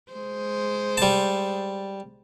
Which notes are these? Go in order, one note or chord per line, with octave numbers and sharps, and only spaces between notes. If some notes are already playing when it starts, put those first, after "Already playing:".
G#3 C5
G3 A5